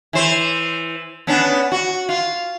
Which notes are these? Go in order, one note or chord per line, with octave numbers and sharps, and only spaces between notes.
E3 C5
B3 C#4 D4
F#4
F4